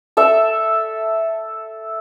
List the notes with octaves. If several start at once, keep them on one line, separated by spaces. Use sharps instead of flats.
A4 E5